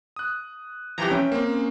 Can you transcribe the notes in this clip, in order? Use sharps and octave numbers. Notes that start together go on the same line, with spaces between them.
D#6 F#6
C2 E3 F3 G4 A#5
C#4 E5 G5
A#3 C4